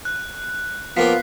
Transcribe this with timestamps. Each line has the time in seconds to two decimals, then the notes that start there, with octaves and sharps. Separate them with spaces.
0.05 F#6
0.97 F3 A#3 B3 F4 G4 B6 C7